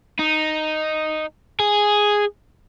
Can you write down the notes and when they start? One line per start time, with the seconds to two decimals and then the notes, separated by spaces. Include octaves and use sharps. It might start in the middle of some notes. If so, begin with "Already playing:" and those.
0.19 D#4
1.60 G#4